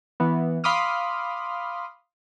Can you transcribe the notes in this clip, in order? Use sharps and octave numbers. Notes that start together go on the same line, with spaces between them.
E3 B3
F5 B5 C6 D6 D#6 F6